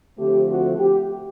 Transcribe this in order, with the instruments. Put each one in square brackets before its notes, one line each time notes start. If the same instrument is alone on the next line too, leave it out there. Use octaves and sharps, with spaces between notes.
[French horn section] D3 F3 A3 C4 G4
F#4
G4